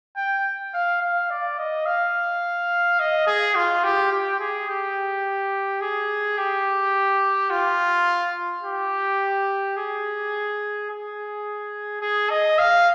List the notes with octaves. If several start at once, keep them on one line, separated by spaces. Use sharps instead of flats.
G5
F5
F5
D5
D#5
F5
D#5
G#4
F4
G4
G4
G#4
G4
G#4
G4
F4
G4
G#4
G#4
G#4
D#5
F5